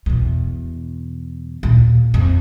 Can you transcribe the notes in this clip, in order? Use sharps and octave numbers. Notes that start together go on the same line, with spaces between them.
E2 B2
D#2 A#2
F2